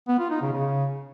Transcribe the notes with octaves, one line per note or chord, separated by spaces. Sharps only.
B3
F4
D#4
C#3
C#3